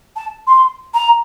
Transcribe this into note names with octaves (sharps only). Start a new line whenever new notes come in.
A5
C6
A#5